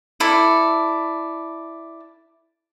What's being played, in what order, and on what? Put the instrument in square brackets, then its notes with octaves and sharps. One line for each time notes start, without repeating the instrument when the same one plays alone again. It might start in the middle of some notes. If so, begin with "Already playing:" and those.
[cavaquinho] E4 A4 D5